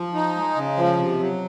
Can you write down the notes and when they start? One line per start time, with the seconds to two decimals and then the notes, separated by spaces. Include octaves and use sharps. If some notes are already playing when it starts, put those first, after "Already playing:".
Already playing: F3
0.14 D#4
0.36 G#3
0.55 C#3
0.77 F3
0.98 C3
1.19 F#3